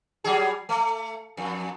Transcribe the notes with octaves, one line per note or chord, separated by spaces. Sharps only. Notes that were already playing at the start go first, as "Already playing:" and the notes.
F#3 G3 G#4
A3
F2